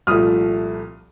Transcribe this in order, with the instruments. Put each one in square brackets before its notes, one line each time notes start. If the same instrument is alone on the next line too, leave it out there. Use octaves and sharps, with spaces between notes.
[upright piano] C2 A#2 F3 A3 D#6 F6